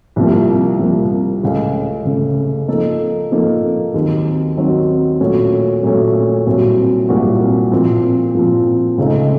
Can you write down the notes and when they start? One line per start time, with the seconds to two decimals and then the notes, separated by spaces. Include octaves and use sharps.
0.16 C2 C3 F3 A#3
0.79 C2 C3 F3 A#3
1.42 C#2 C#3 A3 C#4
2.05 C#2 C#3 A3 C#4
2.68 F3 A#3 D#4 A4
3.31 F3 A#3 D#4 A4
3.94 D#2 D#3 F#3 C4
4.57 D#2 D#3 F#3 C4
5.20 A#2 F#3 A3 C#4
5.83 A#2 F#3 A3 C#4
6.46 C2 A#2 F#3 C4 F#4
7.09 C2 A#2 F#3 C4 F#4
7.72 A#2 F3 C4
8.35 A#2 F3 C4
8.98 C#2 C#3 A3 C4 D#4